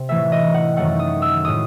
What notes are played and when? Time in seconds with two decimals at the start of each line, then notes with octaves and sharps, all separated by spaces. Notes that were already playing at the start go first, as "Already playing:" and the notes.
Already playing: C3
0.09 A2 E3 A3 E5
0.32 D#5
0.54 F#5
0.76 F#2 D#3 F#3 A3 F#5
0.99 D#6
1.22 E6
1.45 A2 G#3 D#6